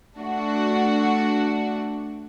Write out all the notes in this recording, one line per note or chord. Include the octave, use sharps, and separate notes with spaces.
A3 D4 F#4